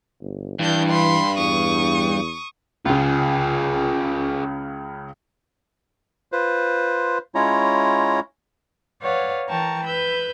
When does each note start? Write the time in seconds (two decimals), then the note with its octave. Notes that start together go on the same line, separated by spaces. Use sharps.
0.22 G1
0.59 G2 E3 D4 G6
0.89 B5 C6
1.38 E2 C#6 D#6
2.85 C#2 C#3 F4 G#4
6.32 F4 B4 C5
7.35 G#3 C#4 E4 F4 C#5 A#5
9.01 B4 C#5 D5 F5 F#5
9.49 E3 A#4 G5 A5 A#5 C#6
9.85 B4 B5 E6 G6